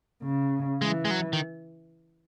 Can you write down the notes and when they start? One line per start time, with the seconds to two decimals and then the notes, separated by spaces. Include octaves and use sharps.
0.23 C#3
0.82 E3 G#3
1.05 G#3
1.11 F#3
1.33 D#3